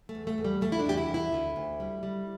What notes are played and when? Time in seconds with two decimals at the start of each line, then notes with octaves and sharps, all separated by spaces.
0.09 A3
0.15 E2
0.27 A3
0.38 E2
0.44 G3
0.61 E2 A3
0.72 E4
0.79 D4
0.86 E2 G4
0.97 E4
1.09 E2
1.14 E4
1.32 D2
1.56 D2
1.80 G3
2.03 G3